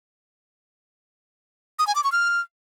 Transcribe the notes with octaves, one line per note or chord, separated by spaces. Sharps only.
D#6
G#5
D6
C#6
F6